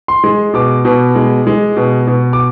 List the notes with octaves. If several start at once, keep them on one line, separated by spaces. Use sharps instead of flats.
C6
G#3
B2 D6
B2
G#3
G#3
B2
B2
D6